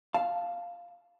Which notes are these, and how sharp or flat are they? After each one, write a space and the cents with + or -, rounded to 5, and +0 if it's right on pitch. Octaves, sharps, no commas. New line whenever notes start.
F5 +0 A5 +0